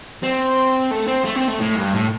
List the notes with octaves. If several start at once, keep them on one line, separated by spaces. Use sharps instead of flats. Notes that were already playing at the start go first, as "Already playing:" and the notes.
C4
A3
C4
A3
C4
A3
A2
G2
A2